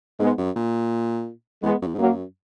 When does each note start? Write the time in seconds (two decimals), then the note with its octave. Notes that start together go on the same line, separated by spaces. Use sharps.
0.19 G#2 G#3 B3
0.38 F#2
0.56 A#2
1.63 E2 G#3 B3
1.82 F#2
1.87 E2
1.95 G#2
1.98 F#2 F#3 A#3